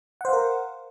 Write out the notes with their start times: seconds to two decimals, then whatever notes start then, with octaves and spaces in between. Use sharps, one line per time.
0.21 F#5
0.25 C5
0.29 F5
0.33 A#4